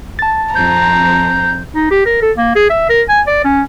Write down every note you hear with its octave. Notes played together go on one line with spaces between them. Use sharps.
A5 A6
F2 C4 A#5 G6
D#4
G4
A#4
A4
A#3
G#4
E5
A#4
G#5
D5
C#4